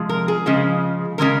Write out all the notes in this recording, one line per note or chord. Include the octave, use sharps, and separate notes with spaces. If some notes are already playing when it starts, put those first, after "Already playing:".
Already playing: C3 F3 G#3
A#4
G#4
C#3 F3 G#3
C#3 F3 G#3 A#4